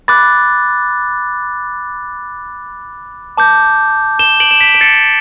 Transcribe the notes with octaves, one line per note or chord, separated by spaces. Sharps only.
B5 D6 F#6 A6
A5 D6 G6
E7 G7
D7 F#7
E7
B6 D7
D7
A6 C#7